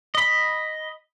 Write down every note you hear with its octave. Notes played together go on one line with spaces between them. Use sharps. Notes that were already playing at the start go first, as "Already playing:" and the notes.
D#5 B5